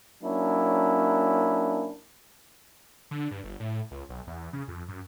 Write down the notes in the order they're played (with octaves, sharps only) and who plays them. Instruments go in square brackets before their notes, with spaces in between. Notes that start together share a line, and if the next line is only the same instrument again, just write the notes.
[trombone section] F#3 A#3 C#4 D4 E4
[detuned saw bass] D3
G2
G1
A2
C#2
B1
E2
C#3
F2
F#2